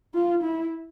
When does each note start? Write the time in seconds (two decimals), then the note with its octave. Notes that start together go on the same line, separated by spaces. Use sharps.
0.14 F4
0.43 E4